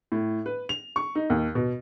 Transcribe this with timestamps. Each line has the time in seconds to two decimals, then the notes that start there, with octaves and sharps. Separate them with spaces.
0.12 A2
0.46 B4
0.69 F7
0.96 C#6
1.15 D#4
1.30 D#2
1.55 B2